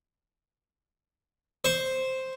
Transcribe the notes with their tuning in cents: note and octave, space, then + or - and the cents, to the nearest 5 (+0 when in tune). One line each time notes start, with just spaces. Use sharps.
C5 +0 C#6 +0